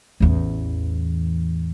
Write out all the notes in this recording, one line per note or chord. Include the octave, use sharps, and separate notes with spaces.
A1 E2